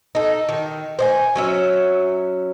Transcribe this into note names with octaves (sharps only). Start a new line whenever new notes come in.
D#4 A4
D#3
C5 D5 G#5
F#3 C#4 E5